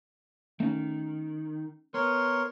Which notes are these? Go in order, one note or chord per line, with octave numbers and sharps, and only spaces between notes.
D#3 A3 C#4
B3 A#4 C#5 C6